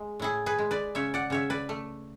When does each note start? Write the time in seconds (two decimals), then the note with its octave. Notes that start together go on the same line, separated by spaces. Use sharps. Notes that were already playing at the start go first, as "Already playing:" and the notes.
Already playing: G#3
0.20 A2 E4 G#4
0.46 G#4 B4
0.59 G#3
0.71 B4 D5
0.95 C#3 C#5 E5
1.14 D5 F#5
1.30 C#3 C#5 E5
1.50 B4 D5
1.69 A3